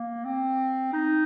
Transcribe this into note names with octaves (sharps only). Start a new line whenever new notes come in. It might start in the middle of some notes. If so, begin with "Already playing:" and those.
Already playing: A#3
C4
D#4